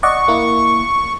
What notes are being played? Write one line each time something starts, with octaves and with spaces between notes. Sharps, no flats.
D5 D#5 F#5 C#6
A#3 E4